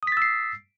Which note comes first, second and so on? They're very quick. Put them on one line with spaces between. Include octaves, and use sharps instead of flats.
D#6 B6 A6 E6 C7